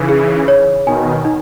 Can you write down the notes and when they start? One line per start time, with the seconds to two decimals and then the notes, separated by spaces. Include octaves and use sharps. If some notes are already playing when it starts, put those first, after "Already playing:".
Already playing: C#3 E3 D#4
0.09 G#4
0.48 C#5
0.86 B2 D#3 G#5
1.25 D#4